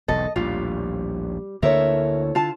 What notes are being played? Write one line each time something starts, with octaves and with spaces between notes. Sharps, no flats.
E1 B1 G#2 A4 D#5
A#1 D#2 A2 G3 F4
D2 D3 A#3 E4 A4 A#4 C#5 E5
D3 F4 A5